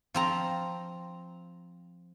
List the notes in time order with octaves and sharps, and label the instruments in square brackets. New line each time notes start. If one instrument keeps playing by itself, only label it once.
[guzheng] F3 C4 A#5